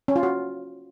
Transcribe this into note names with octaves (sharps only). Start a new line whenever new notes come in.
C#4
F4
F#4